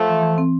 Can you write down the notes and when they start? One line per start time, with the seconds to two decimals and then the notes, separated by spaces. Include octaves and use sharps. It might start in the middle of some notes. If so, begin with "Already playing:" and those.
Already playing: F3 A3
0.09 E3
0.23 E3
0.38 C4